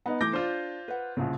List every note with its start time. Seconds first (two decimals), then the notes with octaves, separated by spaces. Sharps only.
0.06 B3 D#4
0.21 E3 A3 D6 G6 A#6
0.33 D4 F4 C5
0.88 B4 F#5
1.17 C2 A#2 C#3